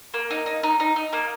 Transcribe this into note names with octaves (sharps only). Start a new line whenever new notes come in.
A#3
D#4
D#4
D#4
D#4
D#4
A#3